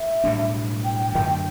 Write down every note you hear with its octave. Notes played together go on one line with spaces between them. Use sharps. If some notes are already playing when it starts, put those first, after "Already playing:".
Already playing: E5
B1 A2 G3 D4
G5
G5
F#2 D3 F#3 A3 G5
G5